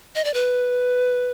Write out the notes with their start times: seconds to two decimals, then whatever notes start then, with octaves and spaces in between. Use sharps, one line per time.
0.15 D#5
0.24 D5
0.34 B4